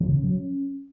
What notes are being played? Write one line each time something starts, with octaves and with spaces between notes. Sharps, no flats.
E3
C#3
C#4
F#3
C#4